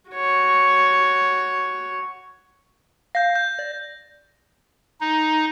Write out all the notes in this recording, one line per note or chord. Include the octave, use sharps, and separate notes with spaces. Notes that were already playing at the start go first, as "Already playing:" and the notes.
F#4 C#5
F5 G6 A#6
G6
D5
D#4